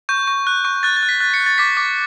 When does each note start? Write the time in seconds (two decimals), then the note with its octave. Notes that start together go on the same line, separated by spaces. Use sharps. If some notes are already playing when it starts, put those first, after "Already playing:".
0.09 C#6 G6
0.28 C#6
0.47 F#6
0.65 C#6
0.83 F#6 A6
0.96 A6
1.03 F#6
1.09 B6
1.20 F#6 A6
1.34 C#7
1.40 F#6
1.46 A6
1.58 D6 B6
1.77 D6